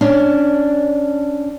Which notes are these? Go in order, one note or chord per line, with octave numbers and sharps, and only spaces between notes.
C#4 D4